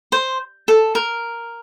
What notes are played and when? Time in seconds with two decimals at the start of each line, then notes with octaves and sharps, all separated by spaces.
0.12 C5
0.68 A4
0.95 A#4